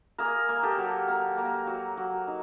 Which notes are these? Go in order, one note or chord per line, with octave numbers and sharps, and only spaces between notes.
A#3 G#4 A#4
A#3
G4 A4
F#3
A#3
A#3
F#3
F#3
D#4